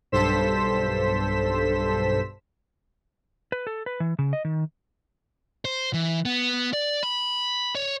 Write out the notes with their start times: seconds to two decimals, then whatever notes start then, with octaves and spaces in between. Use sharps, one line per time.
0.12 B1 G2 A4 C5 B6 E7
3.52 B4
3.67 A4
3.86 B4
4.00 E3
4.19 C#3
4.33 D#5
4.45 D#3
5.65 C5
5.94 E3
6.25 B3
6.73 D5
7.03 B5
7.75 C#5